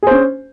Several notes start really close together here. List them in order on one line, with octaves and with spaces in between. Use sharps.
G#4 C5 C#4